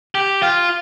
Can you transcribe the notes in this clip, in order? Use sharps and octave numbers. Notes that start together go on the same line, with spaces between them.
G4
F4